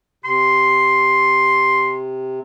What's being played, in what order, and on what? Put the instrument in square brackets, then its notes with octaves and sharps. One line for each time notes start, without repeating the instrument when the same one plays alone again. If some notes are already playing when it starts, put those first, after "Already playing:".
[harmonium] C3 [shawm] C6